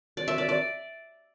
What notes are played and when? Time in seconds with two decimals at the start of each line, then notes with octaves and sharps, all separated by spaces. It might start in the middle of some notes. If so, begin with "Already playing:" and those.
0.17 D5
0.28 E5
0.38 D5
0.49 D5